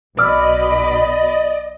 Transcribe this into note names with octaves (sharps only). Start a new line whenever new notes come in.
B1 B2 D5 D#5 B5 D6 E6 F6